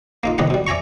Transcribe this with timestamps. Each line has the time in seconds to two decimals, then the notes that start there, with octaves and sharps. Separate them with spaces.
0.23 A#3 D#4 F4
0.38 C2 D#3 B3 G4 D#5 F#5
0.50 B2 G3
0.67 D5 E5 G#5 A#5 C#6